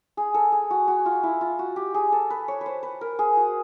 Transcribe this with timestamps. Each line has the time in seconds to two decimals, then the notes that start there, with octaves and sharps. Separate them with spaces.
0.17 G#4
0.34 A4
0.52 G#4
0.71 F#4
0.88 F#4
1.06 F4
1.23 E4
1.41 F4
1.59 F#4
1.76 G4
1.94 G#4
2.12 A4
2.30 B4
2.48 C#5
2.61 B4
2.66 C5
2.83 B4
3.01 A#4
3.19 G#4
3.37 F#4